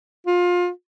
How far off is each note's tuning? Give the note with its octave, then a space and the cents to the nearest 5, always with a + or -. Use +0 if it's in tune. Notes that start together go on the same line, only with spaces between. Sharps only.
F4 +25